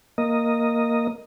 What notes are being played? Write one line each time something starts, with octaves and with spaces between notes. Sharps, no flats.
A#3 D#5